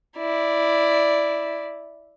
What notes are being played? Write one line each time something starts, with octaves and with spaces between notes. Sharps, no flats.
E4 D5